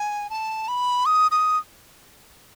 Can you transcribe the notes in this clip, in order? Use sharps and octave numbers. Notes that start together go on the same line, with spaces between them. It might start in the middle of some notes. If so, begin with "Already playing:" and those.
Already playing: G#5
A5
B5
D#6
D#6